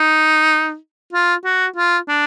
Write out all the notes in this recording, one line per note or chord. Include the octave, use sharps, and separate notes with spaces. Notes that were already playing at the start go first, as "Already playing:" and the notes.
Already playing: D#4
F4
F#4
F4
D4